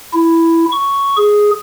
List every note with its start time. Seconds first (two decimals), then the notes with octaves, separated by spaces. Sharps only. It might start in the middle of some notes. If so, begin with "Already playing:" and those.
0.13 E4
0.72 C#6
1.17 G#4